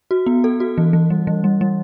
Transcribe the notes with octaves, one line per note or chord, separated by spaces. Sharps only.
F#4
B3
A4
F#4
E3
E3
G3
E3
G3
G3